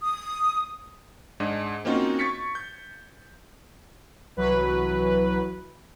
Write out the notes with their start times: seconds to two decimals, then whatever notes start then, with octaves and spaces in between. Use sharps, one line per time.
0.02 D#6
1.40 G#2 G#3 D4 G#4 D#5
1.85 A#3 C4 C#4 D#4 F4 F#4
2.19 C#6 G#6 A6 B6 C#7
2.55 G6
4.36 C2 E3 F#3 B4